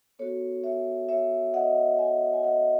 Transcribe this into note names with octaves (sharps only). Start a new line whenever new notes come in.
B3 F#4 A4 C#5
C#5 E5
C#5 E5
D#5 F#5
E5 G#5
G#5
D#5 F#5